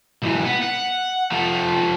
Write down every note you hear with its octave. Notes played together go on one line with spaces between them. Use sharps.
B1 E3
B3
F#5
F3 A3